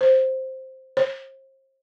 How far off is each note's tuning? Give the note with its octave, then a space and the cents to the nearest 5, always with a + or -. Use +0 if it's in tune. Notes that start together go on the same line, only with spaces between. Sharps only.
C5 +5
C5 +35